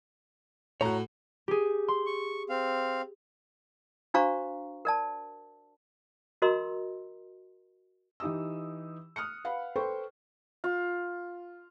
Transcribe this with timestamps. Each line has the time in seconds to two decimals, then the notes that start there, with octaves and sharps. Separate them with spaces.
0.81 A2 F#4 C#5 A#5
1.48 G4 G#4
1.88 C6
2.06 C#6
2.49 C4 F5
4.14 D4 F#4 C5 F5 A#5 C#6
4.85 A#4 D5 A5
6.42 F#4 A#4 D#5 A#5 C6 E6
8.20 E3 D#4 G4 D#6 E6
9.16 D#6 F6 F#6 C#7
9.44 B4 F5 F#5 B5
9.76 A4 B4 C5 G5 C6 C#6
10.64 F4